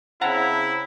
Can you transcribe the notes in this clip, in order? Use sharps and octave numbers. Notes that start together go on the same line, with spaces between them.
C#3 C4 E4 F#5 A5 A#5